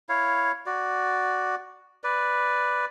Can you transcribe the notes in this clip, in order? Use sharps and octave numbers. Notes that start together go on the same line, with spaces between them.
E4 C#5 F5
F#4 D5
B4 D5